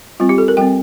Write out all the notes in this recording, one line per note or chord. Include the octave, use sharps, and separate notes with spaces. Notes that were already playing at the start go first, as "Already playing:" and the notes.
G3 C4 F4
G4
A4
A#4
G3 C4 G5